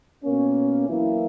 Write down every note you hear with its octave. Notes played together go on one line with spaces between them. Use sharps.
B2 A#3 C#4
F#2 E3 A#3 E4